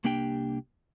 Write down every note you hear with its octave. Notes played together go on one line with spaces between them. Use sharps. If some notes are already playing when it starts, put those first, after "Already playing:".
C2 A#3 D4 G4 G5